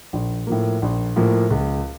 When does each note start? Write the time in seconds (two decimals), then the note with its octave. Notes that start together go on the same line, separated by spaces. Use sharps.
0.13 A#1
0.47 A2 F3 A#3
0.82 A#1
1.16 A2 F3 A#3
1.50 C#2